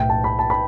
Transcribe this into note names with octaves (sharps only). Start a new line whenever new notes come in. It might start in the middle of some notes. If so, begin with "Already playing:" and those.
Already playing: B1 A2 A3 E5 G5
A5
B5
A5
B5